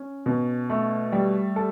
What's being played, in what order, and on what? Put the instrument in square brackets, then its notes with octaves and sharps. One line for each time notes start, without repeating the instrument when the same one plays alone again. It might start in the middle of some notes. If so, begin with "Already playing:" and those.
Already playing: [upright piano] C#4
B2
A3
G3
A4